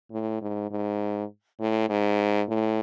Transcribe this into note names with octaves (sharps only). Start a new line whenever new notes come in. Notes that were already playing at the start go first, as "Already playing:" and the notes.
A2
G#2
G#2
A2
G#2
A2